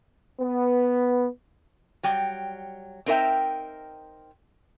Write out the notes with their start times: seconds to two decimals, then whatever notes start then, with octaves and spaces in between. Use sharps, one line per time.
0.39 B3
2.03 F#3 G3 G5
3.06 C4 D#4 A#4 B4 E5 G5